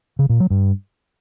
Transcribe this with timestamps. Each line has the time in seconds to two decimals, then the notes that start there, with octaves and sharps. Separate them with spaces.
0.19 C#3
0.29 A#2
0.40 F#3
0.50 G2